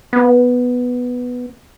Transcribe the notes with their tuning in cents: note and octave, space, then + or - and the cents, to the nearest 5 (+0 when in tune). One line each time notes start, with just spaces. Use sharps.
B3 +0